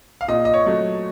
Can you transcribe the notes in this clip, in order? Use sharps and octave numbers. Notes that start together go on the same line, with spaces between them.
F5
A#2 D#5
D#5
C#5
F#3 A3